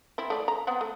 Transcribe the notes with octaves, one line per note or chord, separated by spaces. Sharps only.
C4 E4
A3 D5
A#5
B3 C4 F#5
A3